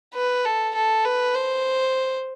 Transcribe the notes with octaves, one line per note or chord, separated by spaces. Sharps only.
B4
A4
A4
B4
C5